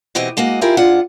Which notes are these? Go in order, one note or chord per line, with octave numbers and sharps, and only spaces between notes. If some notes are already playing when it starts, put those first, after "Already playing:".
B2 E3 B3 C4 G4 D#5
G#3 A#3 F#4 D#5
E4 F4 G4 G#4 A#4
G#2 G#3 D4 F4 F#5